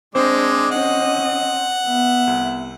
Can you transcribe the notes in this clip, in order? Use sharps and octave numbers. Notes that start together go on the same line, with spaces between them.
G#3 C4 D4 C5 D6
C#4 D#5 F#5
B3 E5
C2